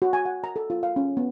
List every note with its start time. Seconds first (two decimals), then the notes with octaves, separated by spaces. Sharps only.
0.02 F#4
0.13 G#5
0.25 F#5
0.44 A#5
0.56 A4
0.70 F4
0.83 F5
0.96 C#4
1.17 B3